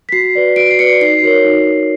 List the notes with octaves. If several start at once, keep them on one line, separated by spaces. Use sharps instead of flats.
B6
F#4 C7
B4 D5
F#4 D7
C7
B4 D5 C#7
D#4 C7
F#4 A#4 C#5
D#4